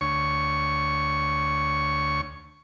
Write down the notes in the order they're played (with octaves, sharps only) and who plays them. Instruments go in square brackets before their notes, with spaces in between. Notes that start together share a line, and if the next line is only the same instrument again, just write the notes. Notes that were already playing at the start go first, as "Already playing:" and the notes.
[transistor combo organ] D2 C#5 C#6